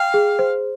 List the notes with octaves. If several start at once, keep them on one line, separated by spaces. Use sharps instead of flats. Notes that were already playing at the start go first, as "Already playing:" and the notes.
Already playing: F5 G5
G#4
C5